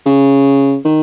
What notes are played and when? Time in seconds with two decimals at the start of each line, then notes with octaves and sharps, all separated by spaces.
0.06 C#3
0.85 D#3